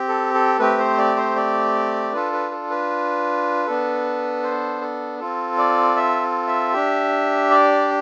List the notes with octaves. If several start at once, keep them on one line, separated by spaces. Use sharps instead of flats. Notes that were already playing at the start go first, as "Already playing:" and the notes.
Already playing: C4 G4
A4
A4
A3 C4 G4 B4
C5
D5
C5
D5
D4 F4 A4 B4
B4
A4
B4
B3 D4 A4
C5
A4
C4 F4 A4
D5
E5
E5
D4 G4
D5